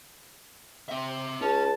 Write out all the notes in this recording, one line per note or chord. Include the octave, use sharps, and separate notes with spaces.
C4 E5
C#2 C#4 A5